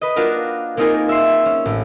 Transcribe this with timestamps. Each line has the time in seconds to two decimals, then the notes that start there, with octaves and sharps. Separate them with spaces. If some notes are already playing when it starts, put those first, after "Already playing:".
0.01 B4 D#5
0.16 A#3 D4 F4 F#4 A#4
0.77 A#3 C4 D#4 F4 G#4 A#4
1.09 E5 C6
1.45 C#4
1.65 A1